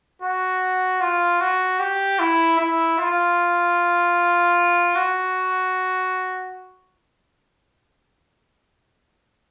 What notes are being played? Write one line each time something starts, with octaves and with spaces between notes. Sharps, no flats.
F#4
F4
F#4
G4
E4
E4
F4
F#4